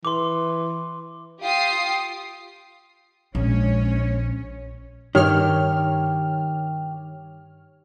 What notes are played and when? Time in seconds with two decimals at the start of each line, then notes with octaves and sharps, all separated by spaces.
0.05 E3 C6 D6
1.42 F4 G4 G5 D#6 C7
3.35 A#1 G#3 C#4 C#5
5.15 G2 D#3 G4 C#5 F6